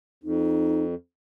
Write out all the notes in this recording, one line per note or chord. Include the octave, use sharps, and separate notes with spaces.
F2 D#4